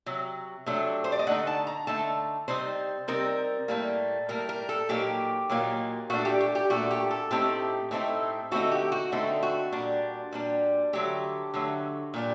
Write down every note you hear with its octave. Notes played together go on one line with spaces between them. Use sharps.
C3 F#3
C3 F#3 A3 D4
C5
D5
D#5
D3 A3 D#4 F#5
A5
A#5
D3 A3 D#4 A5
C3 G3 C4 D#4 C5
C3 G3 C4 D#4 A#4
A2 G3 A#3
A2 G3 A#3 A#4
A#4
A4
A#2 F#3 A#3 D#4 G4
A#2 F#3 A#3 D#4
A#2 A3 D4 F#4
G4
G4
G4
A#2 A3 D4 F#4
G4
A4
A2 A3 C4 D#4 G4
A2 A3 C4 D#4
D3 A3 C4 D#4 F#4
G4
F#4
D3 A3 C4 D#4
F#4
A#2 G3 D4
A#2 G3 D4
D3 F#3 A3 G4
D3 F#3 A3
A#2 G3 D4